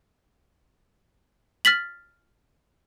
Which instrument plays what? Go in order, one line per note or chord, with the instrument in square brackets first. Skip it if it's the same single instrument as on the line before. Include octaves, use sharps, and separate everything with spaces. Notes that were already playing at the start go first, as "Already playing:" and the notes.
[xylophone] F6 A6 B6 F#7